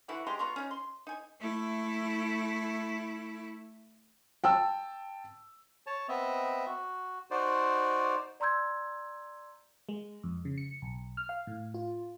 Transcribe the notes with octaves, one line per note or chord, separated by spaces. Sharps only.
D3 E3 E4 F#4
G#3 G4 A#5 C6
B3 F4 A#5 C#6
C#4 D#4
C6
D#4 G#5
A3 E4
G5 A5 E6
C#5 A5
B3 C4 D#5 E5
F#4
D#4 F#4 C5 D5
D5 A#5 C6 E6 G6 G#6
G#3
F2
C#3
C#7
B1
F6
F5
A2
F4